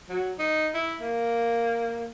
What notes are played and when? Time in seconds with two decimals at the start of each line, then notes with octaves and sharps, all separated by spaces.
0.09 F#3
0.39 D#4
0.74 E4
1.01 A#3